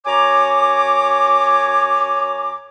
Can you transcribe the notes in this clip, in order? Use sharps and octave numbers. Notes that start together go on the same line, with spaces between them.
F#2 C#5 G#5 A#5 D6